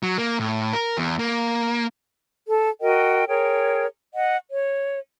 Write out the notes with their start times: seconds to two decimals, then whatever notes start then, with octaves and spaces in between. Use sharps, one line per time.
0.03 F#3
0.18 A#3
0.39 A2
0.73 A#4
0.98 E2
1.19 A#3
2.48 A4
2.81 F#4 A#4 D#5 G5
3.28 G#4 A#4 C#5 G5
4.14 D#5 F#5
4.50 C#5